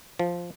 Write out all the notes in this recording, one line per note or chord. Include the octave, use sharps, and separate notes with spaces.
F3